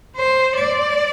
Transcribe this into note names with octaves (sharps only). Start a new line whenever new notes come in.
C5
D5